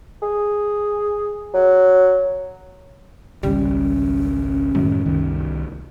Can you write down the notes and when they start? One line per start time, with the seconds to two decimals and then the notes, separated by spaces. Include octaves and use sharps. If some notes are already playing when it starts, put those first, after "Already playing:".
0.23 G#4
1.54 F#3
3.43 G#1 C#2 G3 C#4
4.75 F#2 A2 D#3 G#3
5.05 C2 D#3